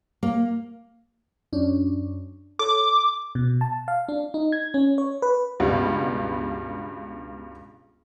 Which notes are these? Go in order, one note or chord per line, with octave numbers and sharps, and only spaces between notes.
A#3
F#2 C#4 D4
A4 C#5 D6
B2
A5
F5
D4
D#4
G#6
C#4
C#5
B4
C#2 G2 B2 G3 B3